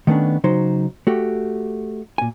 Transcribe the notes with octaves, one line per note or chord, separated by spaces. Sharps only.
D#3 A3 B3 C#4 D4
C#3 F#3 D#4 C5
A3 F#4 G4
A#2 G#5